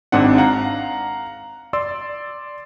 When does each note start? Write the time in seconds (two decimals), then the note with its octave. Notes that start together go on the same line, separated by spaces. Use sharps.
0.12 G#1 G#2 C4 D4 F#5
0.37 F5 F#5 A#5
1.73 D5 C6 E6